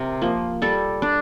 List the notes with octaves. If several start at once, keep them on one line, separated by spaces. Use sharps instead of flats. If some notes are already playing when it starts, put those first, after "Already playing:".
Already playing: C3 A#4
F3 A#3
G3 A4
D4